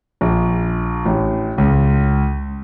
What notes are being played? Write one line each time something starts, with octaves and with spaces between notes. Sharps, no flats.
A#1
A1
C#2